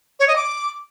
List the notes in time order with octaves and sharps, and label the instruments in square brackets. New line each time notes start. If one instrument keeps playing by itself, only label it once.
[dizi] C#5
D#5
D6